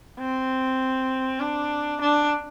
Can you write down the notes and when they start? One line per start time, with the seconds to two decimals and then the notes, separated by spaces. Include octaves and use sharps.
0.19 C4
1.40 D4
2.01 D4